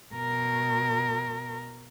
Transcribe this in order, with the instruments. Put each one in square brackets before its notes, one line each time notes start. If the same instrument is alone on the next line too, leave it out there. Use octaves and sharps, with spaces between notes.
[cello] B2 A#4